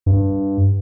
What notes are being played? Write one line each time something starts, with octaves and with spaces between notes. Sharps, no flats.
G2